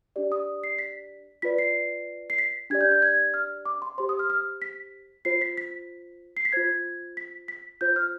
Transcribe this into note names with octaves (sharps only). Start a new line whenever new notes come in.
D4 G4 D5
D#6
C7
B6
F4 B4 D5 B6
C7
C7
B6
D4 G4 D5 G#6
G6
G6
G#6
F6
D6
C6
G4 C5 C6
D#6
F6
F6
B6
F4 C5 C7
B6
B6
C7
B6
F4 C5 G#6
B6
B6
F4 C5 G6
F6